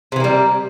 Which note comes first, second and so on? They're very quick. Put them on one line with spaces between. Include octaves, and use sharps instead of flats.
C3 E3 A#3 G3